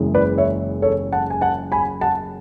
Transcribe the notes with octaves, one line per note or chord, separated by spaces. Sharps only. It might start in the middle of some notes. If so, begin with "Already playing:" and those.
Already playing: F#1 F#2 E3 G#3
B4 D5
C#5 E5
A4 C#5
F#5 A5
G#5
F#5 A5
G#5 B5
F#5 A5